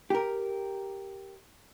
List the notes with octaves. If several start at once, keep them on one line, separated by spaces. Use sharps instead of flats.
G4 A#4